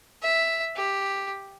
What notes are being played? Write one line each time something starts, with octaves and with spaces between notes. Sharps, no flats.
E5
G4